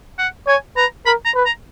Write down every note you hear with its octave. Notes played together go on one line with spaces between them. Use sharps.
F#5
C#5 G#5
B4 A#5
A#4 B5
A#5
B4
A#5